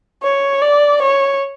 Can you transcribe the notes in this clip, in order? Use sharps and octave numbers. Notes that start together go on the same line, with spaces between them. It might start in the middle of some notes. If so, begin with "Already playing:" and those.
C#5
D5
C#5